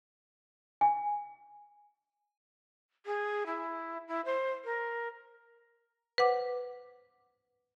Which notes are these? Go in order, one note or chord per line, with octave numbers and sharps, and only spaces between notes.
G#5
G#4
E4
E4
C5
A#4
B4 C5 F#5 D6